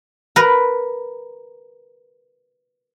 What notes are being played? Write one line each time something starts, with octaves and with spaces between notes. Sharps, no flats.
A#4 B4